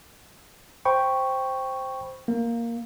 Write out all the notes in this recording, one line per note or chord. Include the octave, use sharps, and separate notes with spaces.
C5 G5 B5 C#6
A#3